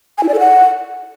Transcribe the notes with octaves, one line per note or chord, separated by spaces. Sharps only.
G#5
E4
D5
A4
F#5